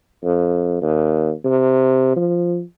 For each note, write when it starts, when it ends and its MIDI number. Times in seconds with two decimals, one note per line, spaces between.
0.24 0.77 41
0.82 1.32 39
1.45 2.15 48
2.16 2.62 53